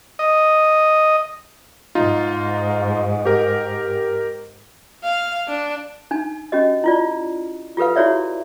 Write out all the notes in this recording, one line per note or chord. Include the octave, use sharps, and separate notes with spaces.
D#5
G#2 D#4 F4
G4 A#4
F5
D4
D4 D#4 G#5
C#4 F#4 G4 D#5
E4 F4 D5
F4 G4 A4 B4 F5
E4 F#4 G#4 C#5 D5 E5